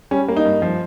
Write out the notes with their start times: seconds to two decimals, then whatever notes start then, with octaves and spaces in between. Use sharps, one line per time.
0.11 G3 C#4
0.28 A#3
0.37 D#4
0.45 G2
0.62 F3